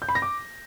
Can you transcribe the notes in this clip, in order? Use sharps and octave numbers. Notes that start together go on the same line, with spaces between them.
G6
B5
A#6
D6